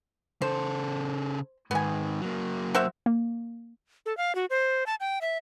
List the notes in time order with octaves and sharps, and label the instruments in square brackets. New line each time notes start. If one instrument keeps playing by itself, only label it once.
[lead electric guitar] C#3 A4 [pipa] C5
[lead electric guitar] G#2 D#3 [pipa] B3 G#5
[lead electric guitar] F#3 A#3
[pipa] F#4 C5 E5
[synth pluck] A#3
[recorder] A4
F5
F#4
C5
A5
G5
E5